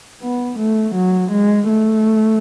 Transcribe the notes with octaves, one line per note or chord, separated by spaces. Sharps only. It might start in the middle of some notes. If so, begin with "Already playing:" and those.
B3
A3
F#3
G#3
A3